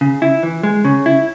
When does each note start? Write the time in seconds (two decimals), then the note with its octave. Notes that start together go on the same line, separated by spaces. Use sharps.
0.01 C#3
0.22 E4
0.43 E3
0.63 G#3
0.85 C#3
1.06 E4